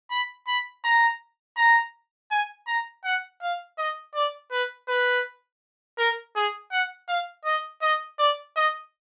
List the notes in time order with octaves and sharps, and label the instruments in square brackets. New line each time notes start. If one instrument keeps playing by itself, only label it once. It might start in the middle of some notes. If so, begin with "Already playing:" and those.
[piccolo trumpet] B5
B5
A#5
A#5
G#5
A#5
F#5
F5
D#5
D5
B4
B4
A#4
G#4
F#5
F5
D#5
D#5
D5
D#5